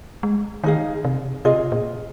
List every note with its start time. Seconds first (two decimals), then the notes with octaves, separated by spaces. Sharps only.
0.23 G#3
0.64 D#3 D#4 G#4 F5
1.05 C3
1.45 C3 F4 G#4 D#5
1.72 A#2